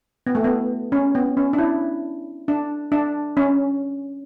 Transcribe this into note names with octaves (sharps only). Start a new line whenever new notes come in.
B3
A3
B3
C#4
B3
C#4
D4
E4
D4
D4
C#4